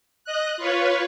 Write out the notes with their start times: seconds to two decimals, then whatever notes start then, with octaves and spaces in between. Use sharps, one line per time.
0.25 D#5 F#6
0.57 F4 B4 C#5